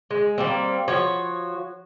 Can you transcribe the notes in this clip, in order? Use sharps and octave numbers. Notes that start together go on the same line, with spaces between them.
G#3
G3 A#3 C4
F3 F#4 C#5